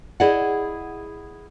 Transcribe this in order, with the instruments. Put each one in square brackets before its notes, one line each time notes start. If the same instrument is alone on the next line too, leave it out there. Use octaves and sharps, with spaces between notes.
[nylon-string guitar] E4 G#4 D5 D#5 F#5